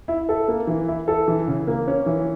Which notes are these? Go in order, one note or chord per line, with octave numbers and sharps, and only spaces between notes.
E4
A4
A#3
E3
E4
A4
E3
C#3
A#3
C#4
E3